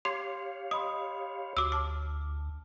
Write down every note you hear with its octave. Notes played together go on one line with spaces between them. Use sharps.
G4 C#5 F5 C6
D#5 B5 C6 D#6
D2 F#4 C#5 D6 E6
A5 D6 F6